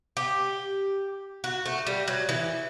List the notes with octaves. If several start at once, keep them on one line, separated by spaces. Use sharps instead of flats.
G4
F#4
A3
G3
F#3
E3